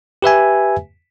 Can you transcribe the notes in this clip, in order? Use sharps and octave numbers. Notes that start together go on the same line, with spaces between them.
G4 B4 E5 G#5